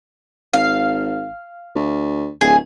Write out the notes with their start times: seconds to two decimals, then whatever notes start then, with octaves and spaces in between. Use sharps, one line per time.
0.54 G#1 F5
1.75 D2
2.41 D1 G#4